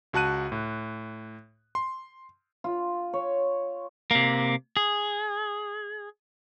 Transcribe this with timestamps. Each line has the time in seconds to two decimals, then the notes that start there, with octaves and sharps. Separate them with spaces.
0.13 C#2 F#4 A5 F#6 D#7
0.52 A2
1.75 C6
2.64 F4
3.13 C#5
4.11 C3 A#3
4.77 G#4